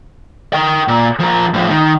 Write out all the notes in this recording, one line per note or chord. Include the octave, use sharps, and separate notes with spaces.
A#4 G5
A#2
F3 A#4
A2 F3
D#3